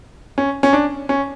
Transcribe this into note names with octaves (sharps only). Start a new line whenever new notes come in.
C#4
C#4
D4
C#4